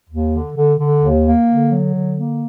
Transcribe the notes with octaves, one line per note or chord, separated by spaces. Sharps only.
D#2
D3
D3
D3
D#2
A#3
D3
F#3
D3
A#3